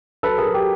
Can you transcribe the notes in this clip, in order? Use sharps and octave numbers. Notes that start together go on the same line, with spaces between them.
F#3 A4 B4
G#4 A#4
F#3
G4 A4